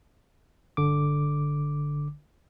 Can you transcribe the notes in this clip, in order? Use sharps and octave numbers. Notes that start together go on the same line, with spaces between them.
G1 D3 D6